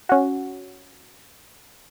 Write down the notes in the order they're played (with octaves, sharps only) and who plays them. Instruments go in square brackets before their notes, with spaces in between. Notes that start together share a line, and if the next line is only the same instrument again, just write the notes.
[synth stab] C#4 F#4